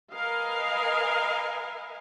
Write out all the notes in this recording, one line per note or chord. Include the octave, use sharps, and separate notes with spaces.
A#4 B4 D#5 F5 G#5